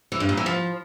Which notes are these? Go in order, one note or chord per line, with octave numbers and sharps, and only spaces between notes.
E3
G2
A#2
E3
F3